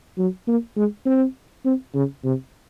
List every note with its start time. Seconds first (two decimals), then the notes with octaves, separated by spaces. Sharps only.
0.18 F#3
0.48 A#3
0.76 G#3
1.06 C4
1.65 C4
1.94 C#3
2.24 C3